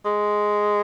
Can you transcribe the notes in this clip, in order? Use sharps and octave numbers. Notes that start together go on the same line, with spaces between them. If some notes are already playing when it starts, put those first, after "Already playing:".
G#3